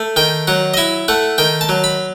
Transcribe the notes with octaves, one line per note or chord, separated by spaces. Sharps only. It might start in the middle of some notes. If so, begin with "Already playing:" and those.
Already playing: A3
D#3 G5
F#3 F#5
D#5
E4 E5
A3 F#5
D#3 G5
A5
F#3
B5